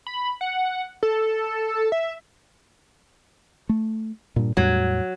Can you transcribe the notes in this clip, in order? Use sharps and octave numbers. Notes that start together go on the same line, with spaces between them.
B5
F#5
A4
E5
A3
G2 A#2
E2 A2 F#3 G3